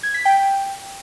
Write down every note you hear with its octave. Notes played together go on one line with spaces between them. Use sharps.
G#6
B6
G5